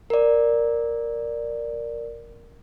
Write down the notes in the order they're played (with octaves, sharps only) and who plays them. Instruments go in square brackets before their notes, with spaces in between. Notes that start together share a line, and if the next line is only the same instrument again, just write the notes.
[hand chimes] A#4 D5